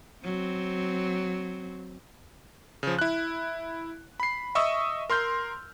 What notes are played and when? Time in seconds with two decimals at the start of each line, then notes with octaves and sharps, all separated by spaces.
0.25 F#3 C4
2.83 C#3 F3
2.99 E4 F#6
4.20 B5 C7
4.55 D#5 E5 C#6 D#6 E6
5.10 A#4 C6 F6 G6